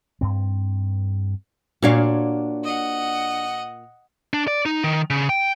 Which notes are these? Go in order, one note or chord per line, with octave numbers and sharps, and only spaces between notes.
G2 C4
A#2 D4 F#4 C#5 F5
D#5 F#5
D4
D5
D#4
D#3
C#3
G5